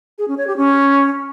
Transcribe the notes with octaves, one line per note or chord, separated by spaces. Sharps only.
G#4
C#4
C#5
G4
C#4